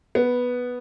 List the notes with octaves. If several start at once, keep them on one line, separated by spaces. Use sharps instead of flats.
B3